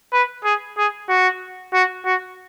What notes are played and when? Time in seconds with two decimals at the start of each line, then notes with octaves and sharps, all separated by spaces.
0.13 B4
0.44 G#4
0.77 G#4
1.09 F#4
1.73 F#4
2.05 F#4